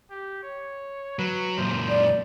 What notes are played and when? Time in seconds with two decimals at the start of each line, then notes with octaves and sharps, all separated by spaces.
0.10 G4
0.43 C#5
1.19 F#3 B4
1.58 F#2 A#2 C5
1.89 D5